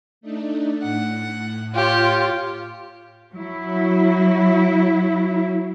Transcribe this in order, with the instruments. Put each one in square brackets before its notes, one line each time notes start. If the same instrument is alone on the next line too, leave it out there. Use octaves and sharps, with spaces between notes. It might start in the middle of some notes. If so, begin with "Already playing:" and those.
[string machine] A3 D4 D#4
[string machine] A2 [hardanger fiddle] F#5
[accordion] F4 [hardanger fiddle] G4 C#5
[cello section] F#3 E4